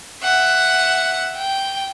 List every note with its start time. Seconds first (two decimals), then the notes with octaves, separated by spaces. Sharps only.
0.23 E5 F#5
1.37 G5